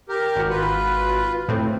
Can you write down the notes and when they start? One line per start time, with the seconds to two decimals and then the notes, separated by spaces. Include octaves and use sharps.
0.09 G4 A#4
0.36 G#1 F#4
0.50 F4 B4
1.48 A2 C4